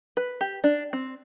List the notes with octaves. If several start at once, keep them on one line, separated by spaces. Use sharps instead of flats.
B4
G4
D4
C4